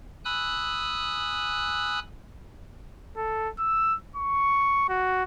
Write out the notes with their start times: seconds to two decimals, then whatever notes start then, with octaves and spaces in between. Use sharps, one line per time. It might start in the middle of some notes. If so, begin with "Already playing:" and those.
0.25 G#5 B5 D#6 E6 F#6
3.17 A4
3.59 E6
4.16 C#6
4.89 F#4